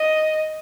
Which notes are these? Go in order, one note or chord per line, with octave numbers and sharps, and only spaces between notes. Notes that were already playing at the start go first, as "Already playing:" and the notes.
Already playing: D#5